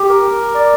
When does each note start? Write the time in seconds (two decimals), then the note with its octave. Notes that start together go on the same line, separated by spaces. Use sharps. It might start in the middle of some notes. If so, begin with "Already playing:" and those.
Already playing: G4
0.09 A#4
0.54 D5